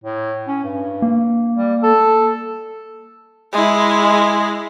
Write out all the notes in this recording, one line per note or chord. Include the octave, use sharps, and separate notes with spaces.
A2
C#4
G2
A#3
G3
A4
G#3 E4